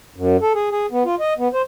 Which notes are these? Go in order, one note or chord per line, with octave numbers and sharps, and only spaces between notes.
F#2
A4
G#4
G#4
B3
F4
D#5
B3
C5